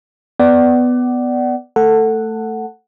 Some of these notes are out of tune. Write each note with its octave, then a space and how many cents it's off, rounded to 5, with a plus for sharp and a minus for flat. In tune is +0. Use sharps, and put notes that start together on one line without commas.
B3 +10 D5 +0 F#5 +30
A3 +0 A4 +15 F#5 +0